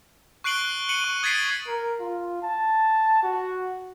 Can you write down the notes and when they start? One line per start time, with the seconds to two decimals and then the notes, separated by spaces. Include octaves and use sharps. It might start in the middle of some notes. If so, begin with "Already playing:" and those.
0.44 C#6 F#6 C7 D7 F#7 G7
0.89 C#7 D#7 F#7
1.04 C#6
1.23 D#6 G#6 A6 B6 C7 D7
1.67 A#4
2.00 F4
2.42 A5
3.23 F#4